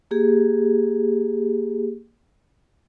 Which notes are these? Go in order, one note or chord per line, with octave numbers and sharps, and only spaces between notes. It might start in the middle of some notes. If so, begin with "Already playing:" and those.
A#3 G4 G#4